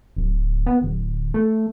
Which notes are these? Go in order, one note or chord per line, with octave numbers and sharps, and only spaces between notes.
D1
B3
D1
A3